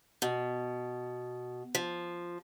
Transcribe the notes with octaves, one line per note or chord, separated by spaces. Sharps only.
B2
F3